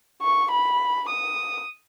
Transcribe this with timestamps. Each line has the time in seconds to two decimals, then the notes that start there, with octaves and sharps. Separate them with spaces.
0.22 C#6
0.51 B5
1.09 D#6